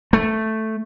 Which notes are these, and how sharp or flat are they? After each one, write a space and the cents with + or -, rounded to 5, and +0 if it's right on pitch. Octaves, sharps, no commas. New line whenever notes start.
A3 +0